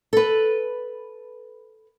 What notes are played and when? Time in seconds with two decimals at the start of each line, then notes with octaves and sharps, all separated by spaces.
0.13 A4 B4